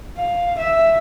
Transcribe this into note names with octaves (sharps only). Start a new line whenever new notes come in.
F5
E5